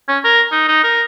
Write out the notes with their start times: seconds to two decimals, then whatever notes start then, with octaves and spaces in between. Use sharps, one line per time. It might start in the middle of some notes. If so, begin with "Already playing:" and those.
0.08 C#4
0.24 A#4
0.51 D#4
0.68 D#4
0.84 A#4